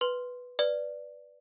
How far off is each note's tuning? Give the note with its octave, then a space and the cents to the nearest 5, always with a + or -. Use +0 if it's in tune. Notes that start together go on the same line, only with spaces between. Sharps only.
B4 +0 C6 +0
B4 +0 D5 +0